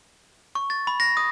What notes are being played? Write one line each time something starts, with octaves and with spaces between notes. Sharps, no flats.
C#6
A6
B5
A#6
D#6